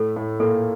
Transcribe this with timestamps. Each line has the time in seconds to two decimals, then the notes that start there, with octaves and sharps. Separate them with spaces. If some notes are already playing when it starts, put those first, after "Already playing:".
Already playing: A2 A3 A4
0.16 A2 A3
0.40 A#2 A#3 A4